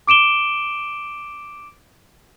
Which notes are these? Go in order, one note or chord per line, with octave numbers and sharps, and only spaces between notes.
D6 D7 E7 G7